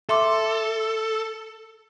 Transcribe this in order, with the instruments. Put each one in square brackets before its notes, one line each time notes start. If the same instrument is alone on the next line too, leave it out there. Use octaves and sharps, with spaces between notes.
[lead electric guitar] A4 [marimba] E5 C6 D6